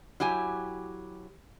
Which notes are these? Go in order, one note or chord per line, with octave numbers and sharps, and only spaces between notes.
F#3 E4 G4 G#5